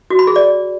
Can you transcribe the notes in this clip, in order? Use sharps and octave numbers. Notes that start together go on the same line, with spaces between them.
F#4
B5
G#4
D5